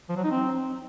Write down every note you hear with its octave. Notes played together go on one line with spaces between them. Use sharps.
F3
F#3
D#4
C4